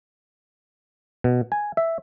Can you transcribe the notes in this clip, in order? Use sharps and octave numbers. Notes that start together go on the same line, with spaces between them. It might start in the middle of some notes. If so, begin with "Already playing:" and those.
B2
G#5
E5